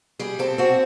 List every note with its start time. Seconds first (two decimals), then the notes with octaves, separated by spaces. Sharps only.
0.19 G3 G#4
0.39 C4 A4
0.58 C4 F#4